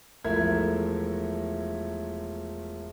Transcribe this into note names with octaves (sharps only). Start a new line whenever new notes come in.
E1 F3 A3 E4 A#4 G#6